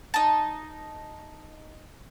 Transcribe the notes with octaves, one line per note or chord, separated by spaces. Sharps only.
D#4 A5